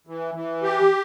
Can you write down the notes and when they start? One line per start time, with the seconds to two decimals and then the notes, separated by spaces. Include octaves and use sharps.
0.07 E3
0.35 E3
0.63 G4